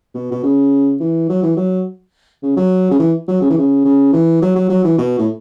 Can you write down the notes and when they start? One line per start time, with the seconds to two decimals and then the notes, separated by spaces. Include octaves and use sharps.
0.14 B2
0.32 B2
0.43 C#3
1.00 E3
1.29 F#3
1.43 E3
1.57 F#3
2.42 C#3
2.57 F#3
2.91 C#3
2.99 E3
3.28 F#3
3.41 C#3
3.50 E3
3.58 C#3
3.85 C#3
4.13 E3
4.42 F#3
4.56 F#3
4.69 F#3
4.84 E3
4.98 B2
5.18 A2